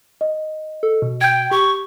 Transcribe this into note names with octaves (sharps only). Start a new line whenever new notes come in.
D#5
A4
B2
G5 G6 G#6
G4 C#6